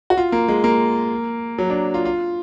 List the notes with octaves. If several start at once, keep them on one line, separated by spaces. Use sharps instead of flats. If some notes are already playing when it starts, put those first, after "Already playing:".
F#4
F4
A#3
G#3
A#3
F#3
D4
F4
F4